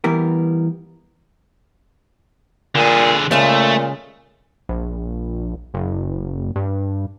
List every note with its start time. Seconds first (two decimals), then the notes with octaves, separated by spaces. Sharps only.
0.04 E3 G3 B3 A#4
2.75 A#2 D3 G#4
3.31 A#2 C#3 G#3 A3 F5
4.69 A#1
5.74 F#1
6.56 G2